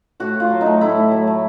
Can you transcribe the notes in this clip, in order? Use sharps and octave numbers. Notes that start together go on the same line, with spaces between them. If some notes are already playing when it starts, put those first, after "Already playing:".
A2 F#4
A2
F4
F#3
D#4
A3
A2 E4
A2
F#3
A3